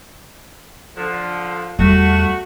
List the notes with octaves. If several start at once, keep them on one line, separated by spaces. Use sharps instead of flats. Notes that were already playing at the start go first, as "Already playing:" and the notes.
D3 F3
E2 G3 A3 F#4